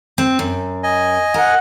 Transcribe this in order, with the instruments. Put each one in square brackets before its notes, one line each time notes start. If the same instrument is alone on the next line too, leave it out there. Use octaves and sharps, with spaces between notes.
[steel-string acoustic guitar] C4
F#2
[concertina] D#5 G#5
[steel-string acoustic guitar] A#4 [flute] F#5